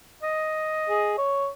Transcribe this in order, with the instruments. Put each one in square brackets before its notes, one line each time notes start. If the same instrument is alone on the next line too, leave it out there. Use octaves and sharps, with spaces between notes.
[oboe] D#5
[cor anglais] G#4
C#5